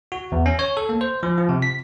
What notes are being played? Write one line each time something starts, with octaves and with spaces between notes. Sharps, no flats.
F#4
E2
C#4
C#5
A4
A#3
C5
F3
F3
C3
B6